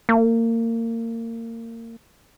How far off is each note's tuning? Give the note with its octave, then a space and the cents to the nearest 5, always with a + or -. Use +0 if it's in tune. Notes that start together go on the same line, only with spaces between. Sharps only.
A#3 -30